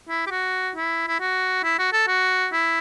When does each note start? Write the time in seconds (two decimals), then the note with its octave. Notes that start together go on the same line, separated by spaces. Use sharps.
0.09 E4
0.27 G4
0.30 F#4
0.75 E4
1.08 E4
1.20 F#4
1.64 E4
1.79 F#4
1.93 A4
2.07 F#4
2.53 E4